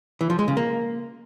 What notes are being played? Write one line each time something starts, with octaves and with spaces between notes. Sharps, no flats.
E3
F3
G#3
C#3
A#3